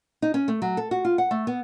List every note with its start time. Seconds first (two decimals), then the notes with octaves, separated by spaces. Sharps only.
0.22 D#4
0.34 C#4
0.48 A3
0.62 F#3
0.77 A4
0.91 F#4
1.05 F4
1.18 F#5
1.31 A3
1.47 B3